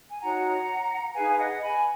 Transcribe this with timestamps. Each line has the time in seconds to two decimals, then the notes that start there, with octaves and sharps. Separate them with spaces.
0.10 G#5
0.21 D#4 F#4 C#5 F#5 A#5
1.15 D#4 G#4 B4 F5 G#5
1.31 F5
1.38 D#5 F#5
1.62 G#5 B5